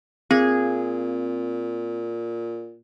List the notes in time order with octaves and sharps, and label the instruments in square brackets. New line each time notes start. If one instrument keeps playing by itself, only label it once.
[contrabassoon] A#2 [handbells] C4 [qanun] G#4